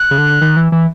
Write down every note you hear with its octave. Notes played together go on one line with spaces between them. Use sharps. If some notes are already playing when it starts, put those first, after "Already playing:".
Already playing: F#6
C#3
D3
D#3
E3
E3